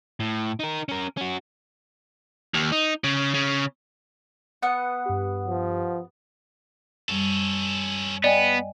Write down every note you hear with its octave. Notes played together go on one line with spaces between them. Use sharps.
A2
D#4 A#4
C#4 A#4
C#4 F#4
D#2
D#4
C#3
C#3
B3 F#5
G2 G4
F3
F#2 G3 C#4 A4
B3 D5 D#5 G5 G#5